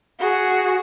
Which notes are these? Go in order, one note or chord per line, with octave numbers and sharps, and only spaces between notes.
F#4 G#4